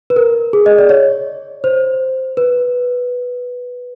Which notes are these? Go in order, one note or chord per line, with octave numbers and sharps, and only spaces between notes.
B4
A#4
G#4
D#5
D5
C#5
C5
B4